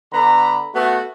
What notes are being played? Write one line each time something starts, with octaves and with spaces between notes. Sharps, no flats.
D3 B3 A#5 B5
A3 B3 F#4